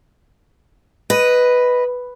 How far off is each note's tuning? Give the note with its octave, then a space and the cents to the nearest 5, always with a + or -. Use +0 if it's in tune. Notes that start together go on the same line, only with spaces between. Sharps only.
B4 +0 D#5 +0